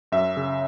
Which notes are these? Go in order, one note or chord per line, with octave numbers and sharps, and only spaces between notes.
F#2 E5
C#3